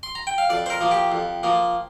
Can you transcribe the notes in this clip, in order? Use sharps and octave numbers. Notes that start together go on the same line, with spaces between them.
C6
A#5
G5
F5
F2 D5
C5
A#4
F3 A#3
G4
F2
F3 A#3